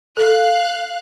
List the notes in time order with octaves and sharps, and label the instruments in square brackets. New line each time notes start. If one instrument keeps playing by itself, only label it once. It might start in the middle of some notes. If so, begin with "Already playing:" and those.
[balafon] A4 [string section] F5 F#6